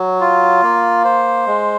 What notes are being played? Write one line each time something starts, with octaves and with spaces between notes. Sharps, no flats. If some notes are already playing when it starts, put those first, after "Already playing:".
Already playing: F#3
F4
A#3
C5
G#3